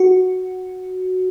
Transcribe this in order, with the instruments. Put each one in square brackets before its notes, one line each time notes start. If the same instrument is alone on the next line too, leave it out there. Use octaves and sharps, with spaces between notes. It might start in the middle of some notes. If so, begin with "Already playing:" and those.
Already playing: [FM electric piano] F#4